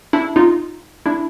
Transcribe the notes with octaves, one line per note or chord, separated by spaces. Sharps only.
D4 E4
D#4 F4
D4 E4